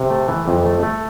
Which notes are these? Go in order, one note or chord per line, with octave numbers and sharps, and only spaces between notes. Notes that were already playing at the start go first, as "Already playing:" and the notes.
Already playing: C3
A3
E3
F2
A3
A3